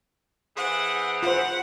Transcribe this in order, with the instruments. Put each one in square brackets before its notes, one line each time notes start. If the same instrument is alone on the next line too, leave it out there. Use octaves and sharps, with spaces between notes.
[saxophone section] E3 C4 G#4 [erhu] F#5
[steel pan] F4 C5 [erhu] F#5